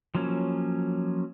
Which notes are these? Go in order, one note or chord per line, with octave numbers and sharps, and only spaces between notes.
F3 F#3 A#3 C#4